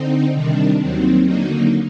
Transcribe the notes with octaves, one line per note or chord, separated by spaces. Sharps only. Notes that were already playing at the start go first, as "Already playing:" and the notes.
Already playing: D3 C4 D#4
C3 D#3 G3 D4
D#2 D#3 F#3 C4
D3 F#3 A#3 D#4